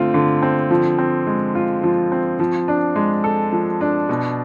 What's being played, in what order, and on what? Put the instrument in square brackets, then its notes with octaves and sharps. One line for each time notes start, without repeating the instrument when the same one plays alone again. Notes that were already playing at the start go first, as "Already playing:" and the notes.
Already playing: [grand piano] D3 A3 C4 F4
D3
C4
F3
C4
G#3
F4
F3
C4
F3
D4
G#3
A4
F3
D4
B2